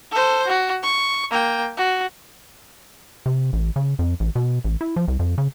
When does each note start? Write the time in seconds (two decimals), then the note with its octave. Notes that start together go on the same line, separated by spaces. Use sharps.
0.11 A4 C5
0.47 F#4
0.83 C#6
1.31 A#3 G5
1.77 F#4
3.26 C3
3.53 A1
3.76 C#3
3.99 F2
4.20 A1
4.35 B2
4.64 A1
4.81 E4
4.96 F3
5.08 C2
5.19 F2
5.38 C#3